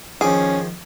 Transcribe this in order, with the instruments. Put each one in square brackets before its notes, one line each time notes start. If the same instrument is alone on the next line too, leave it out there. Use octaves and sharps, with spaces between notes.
[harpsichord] D#3 F3 D6 [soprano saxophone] C#4 [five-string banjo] G#4